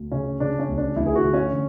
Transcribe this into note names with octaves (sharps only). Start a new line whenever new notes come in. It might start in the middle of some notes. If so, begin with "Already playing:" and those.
Already playing: D2
C#3 C#4
C#3 D4
C#4
D2
D4
D2 E4
G#4
F#4
D3
C#4
D3